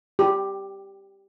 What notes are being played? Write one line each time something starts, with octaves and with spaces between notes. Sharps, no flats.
G4